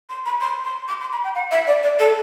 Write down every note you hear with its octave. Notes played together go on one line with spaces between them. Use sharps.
C6
B5
C6
C6
D6
C6
B5
G5
F#5
E5
D5
D5
A4